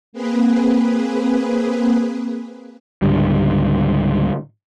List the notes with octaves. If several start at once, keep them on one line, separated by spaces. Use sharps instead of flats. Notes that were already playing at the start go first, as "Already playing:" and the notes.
A#3 C4 G#4 B4
C#2 G#2 D3 G3